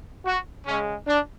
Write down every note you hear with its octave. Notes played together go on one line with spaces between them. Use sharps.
F#4
C#3 G#3 C#4
D4